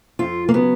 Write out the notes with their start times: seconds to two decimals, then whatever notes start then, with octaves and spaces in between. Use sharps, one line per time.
0.19 F2 F4
0.49 A#3
0.54 C#3 F#3 B3